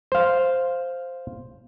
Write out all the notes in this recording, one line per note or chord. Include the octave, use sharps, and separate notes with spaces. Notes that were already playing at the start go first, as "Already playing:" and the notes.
C5 F5